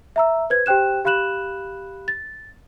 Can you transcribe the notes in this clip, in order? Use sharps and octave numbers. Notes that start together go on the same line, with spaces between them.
E5 A#5 E6
B4 C5 G#6
G4 C5 G5 F#6 E7
G4 F5 B5 F#6 E7 F#7
A6